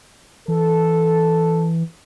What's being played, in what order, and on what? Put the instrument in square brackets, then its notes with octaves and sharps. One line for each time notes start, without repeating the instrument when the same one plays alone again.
[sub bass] E3 [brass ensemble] A4